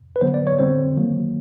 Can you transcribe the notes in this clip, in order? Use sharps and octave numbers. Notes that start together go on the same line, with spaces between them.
B4
D3 F#3 B3 C5
D5
C#5
D3 G3 C4 C5
D#3 F#3 A#3